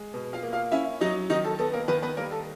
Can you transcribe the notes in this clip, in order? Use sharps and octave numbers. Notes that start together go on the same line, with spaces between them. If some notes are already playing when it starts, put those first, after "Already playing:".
Already playing: G#3
B2
F4 F5
A#3
F4 F5
C#4 E4 E5
F#3 D#4 D#5
D#3 D#4 D#5
A4
B3 A4
A#3 A#4
D#3 B3 B4
B3 B4
G3 A#3 A#4
A4